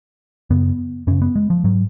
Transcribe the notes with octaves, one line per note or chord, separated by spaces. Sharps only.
F#2 C#3 B3
F#2 C#3 C#4
B3
G#3
F3
G#2 F#3